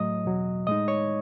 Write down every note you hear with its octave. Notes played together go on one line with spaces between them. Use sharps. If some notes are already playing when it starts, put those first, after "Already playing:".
Already playing: A2 F#3 A3 D#5 D#6
E2 B2 F#3
A2 G#3 D#4 D#5 D#6
C#5 C#6